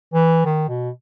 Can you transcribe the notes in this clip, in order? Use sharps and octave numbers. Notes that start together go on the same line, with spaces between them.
E3
D#3
B2